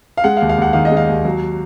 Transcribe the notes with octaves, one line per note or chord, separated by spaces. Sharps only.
F5
G#3 F#5
F5
D#2
F5
D#2 F#5
D#3 F5
D#5
G#3
F5
D#2
F#3